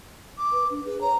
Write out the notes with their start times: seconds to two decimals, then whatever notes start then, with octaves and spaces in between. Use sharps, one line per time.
0.38 D6
0.52 B4
0.70 D4
0.85 G#4 B4
1.01 C#5 A#5